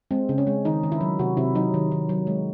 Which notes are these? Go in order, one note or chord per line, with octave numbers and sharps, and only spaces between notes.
G#3 C4
C#3
C#4
G#3
D#3 D#4
D#3
E4
F#3
C3 F#4
C3 E4
F#3 D#4
D#3
D#3
F#3
G#3